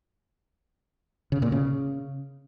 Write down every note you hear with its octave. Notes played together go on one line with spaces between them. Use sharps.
C#3
A#2
C#3